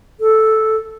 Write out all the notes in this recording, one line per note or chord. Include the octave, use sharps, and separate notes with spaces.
A4